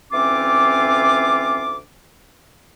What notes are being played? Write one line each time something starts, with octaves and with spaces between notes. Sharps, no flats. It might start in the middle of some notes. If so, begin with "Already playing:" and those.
D2 E3 C4 C#4 F4 D6